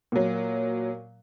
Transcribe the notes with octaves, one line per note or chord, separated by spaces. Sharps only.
A#2 F#3